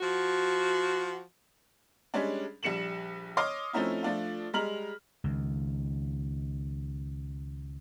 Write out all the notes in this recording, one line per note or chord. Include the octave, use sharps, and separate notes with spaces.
F3 F#4
G3 G#3 C#4 D4
A#1 G3 C#7 E7 F#7
C#5 D#5 C6 D6 D#6 F6
F3 A3 C4 C#4 D#4 E4
F3 A3 D4 F4
G3 G#3 A#5 F6 F#7
C#2 D#3